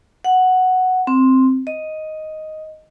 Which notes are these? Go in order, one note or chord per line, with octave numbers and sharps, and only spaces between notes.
F#5
C4
D#5